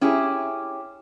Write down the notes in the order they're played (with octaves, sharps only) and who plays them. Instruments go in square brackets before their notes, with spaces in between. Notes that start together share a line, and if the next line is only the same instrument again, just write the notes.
[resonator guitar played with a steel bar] C#4 E4 G4 G#4